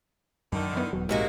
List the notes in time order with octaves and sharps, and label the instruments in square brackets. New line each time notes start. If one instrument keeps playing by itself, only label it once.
[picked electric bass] F#2 [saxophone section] D3 D#3
[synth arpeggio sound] E3 B3
[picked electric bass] D#1 F#3
[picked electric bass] A#1 [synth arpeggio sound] G#2 [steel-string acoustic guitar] C3 G#3 A#3 [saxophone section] F#4 A#4